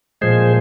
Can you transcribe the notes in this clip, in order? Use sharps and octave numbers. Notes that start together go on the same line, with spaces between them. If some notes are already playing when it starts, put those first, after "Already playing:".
A#2 F3 G#3 G#4 C5